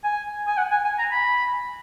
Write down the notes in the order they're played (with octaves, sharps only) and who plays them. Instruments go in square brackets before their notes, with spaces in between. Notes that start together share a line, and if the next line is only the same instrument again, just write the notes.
[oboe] G#5
G#5
F#5
G#5
G#5
A#5
B5